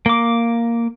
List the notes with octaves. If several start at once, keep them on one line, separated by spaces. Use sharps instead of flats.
A#3 D6